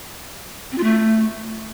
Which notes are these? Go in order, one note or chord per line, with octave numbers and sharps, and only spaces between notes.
C4
F4
A3